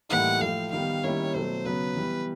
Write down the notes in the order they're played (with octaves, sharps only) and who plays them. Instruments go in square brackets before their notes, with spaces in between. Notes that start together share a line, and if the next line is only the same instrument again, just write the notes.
[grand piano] A2 E3 G3 A#3 D#4 [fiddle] F#5
[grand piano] A2 F3 A3 [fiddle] F5
[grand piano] D#3 G3 B3 [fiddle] F5
[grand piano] D#3 G3 A#3 C#4 E4 [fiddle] C#5
[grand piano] B2 F#3 A3 [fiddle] C5
[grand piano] C#3 F#3 B3 [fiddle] B4
[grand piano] E3 G3 B3